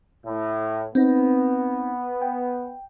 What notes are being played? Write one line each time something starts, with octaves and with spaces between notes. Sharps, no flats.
A2
B3 C4 D#4
G5